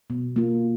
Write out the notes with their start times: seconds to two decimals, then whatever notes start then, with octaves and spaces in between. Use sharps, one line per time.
0.10 B2
0.36 A#3 F4